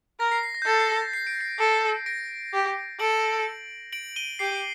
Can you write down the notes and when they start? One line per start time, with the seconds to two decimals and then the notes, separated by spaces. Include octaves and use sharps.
0.20 A#4 A#6
0.32 C7
0.43 C7
0.55 A#6
0.62 G6
0.66 A4 A6
0.80 C7
0.89 A#6
1.13 C7
1.27 D7
1.41 C7
1.59 A4
2.06 A#6 D7
2.53 G4
2.99 A4 D7 F#7
3.93 D7 F#7
4.16 D#7 G7
4.39 G4 C7